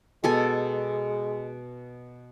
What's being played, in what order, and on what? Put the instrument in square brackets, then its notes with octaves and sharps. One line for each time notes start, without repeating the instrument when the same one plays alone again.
[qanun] B2 A4 G#5 [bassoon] G#3